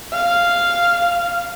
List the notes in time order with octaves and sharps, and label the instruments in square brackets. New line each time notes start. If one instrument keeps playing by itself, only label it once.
[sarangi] F5